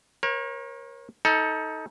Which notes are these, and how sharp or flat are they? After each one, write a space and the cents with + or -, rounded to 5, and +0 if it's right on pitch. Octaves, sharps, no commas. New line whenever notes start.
A#4 +30 C#5 -35
D#4 +25 A4 +0